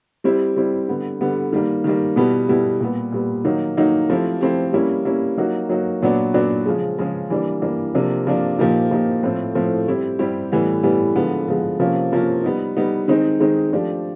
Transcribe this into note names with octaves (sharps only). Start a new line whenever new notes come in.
G3 C4 E4 G4
G3 C4 E4 G4
D3 G3 B3
D3 G3 B3
D#3 G3 A#3
D#3 G3 A#3
B2 G3 B3 E4 G4
B2 G3 B3 E4 G4
A#2 G3 B3
A#2 G3 B3
D#3 F#3 A#3 D#4
D#3 F#3 A#3 D#4
F3 A3 C4 E4 G4
F3 A3 C4 E4 G4
G3 A#3 C#4 E4
G3 A#3 C#4 E4
F#3 A#3 D#4 F#4
F#3 A#3 D#4 F#4
A#2 F#3 B3 D4 F#4
A#2 F#3 B3 D4 F#4
C#3 F3 G#3
C#3 F3 G#3
E3 G3 A#3 D4
E3 G3 A#3 D4
C3 F3 A#3 D4
C3 F3 A#3 D4
A#2 F3 A#3 D#4 G4
A#2 F3 A#3 D#4 G4
A2 F3 A3 C4
A2 F3 A3 C4
G3 C4 E4 G4
G3 C4 E4 G4
A2 E3 G3 B3
A2 E3 G3 B3
D3 F3 G#3 B3
D3 F3 G#3 B3
C3 F3 A#3 C#4 F4
C3 F3 A#3 C#4 F4
G3 B3 D#4
G3 B3 D#4
D#3 G#3 C4 D#4
D#3 G#3 C4 D#4
F3 A3 D4 G4